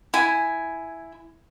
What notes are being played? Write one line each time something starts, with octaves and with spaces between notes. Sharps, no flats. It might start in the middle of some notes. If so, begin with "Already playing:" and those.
E4 G#5